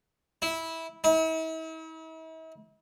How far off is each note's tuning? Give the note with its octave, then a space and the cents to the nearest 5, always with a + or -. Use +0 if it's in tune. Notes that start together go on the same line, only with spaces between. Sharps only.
E4 -15
E4 -45